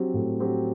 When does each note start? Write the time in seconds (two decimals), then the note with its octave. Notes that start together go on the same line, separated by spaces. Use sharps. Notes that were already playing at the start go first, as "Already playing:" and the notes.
Already playing: F#3 C4 G4
0.14 A2
0.40 F#3 C4 G4